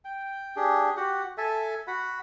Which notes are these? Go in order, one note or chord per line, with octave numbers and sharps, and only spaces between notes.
G5
D4 G4 G#4
F#4 G4 F#5
A4 E5 G#5 A5
F#4 F#5 B5